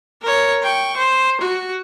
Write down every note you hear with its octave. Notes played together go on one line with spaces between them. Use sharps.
A#4 C#5
G5 C#6
C5
F#4